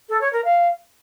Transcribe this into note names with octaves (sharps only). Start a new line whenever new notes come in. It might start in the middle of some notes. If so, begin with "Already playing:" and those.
A4
C#5
A#4
F5